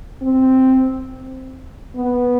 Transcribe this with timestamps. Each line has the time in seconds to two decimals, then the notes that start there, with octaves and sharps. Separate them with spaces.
0.22 C4
1.96 B3